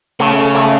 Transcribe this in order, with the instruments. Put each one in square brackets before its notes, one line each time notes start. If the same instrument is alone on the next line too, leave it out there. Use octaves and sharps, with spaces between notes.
[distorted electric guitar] C#3 [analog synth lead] A3
[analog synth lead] A3